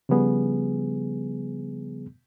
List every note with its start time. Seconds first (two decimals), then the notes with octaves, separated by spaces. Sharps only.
0.09 C#3 F3 G3 B3 G#4